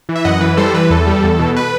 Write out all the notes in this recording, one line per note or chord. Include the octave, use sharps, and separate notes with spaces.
E3
E5
F#2 D#5 F#5
E3 B4
G3 A4 C5
E3 B4
E2 A4
G3
E2
B2
B4